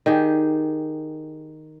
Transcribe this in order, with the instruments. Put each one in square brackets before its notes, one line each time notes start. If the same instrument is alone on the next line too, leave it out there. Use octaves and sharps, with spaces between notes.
[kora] D#3 G4 G#4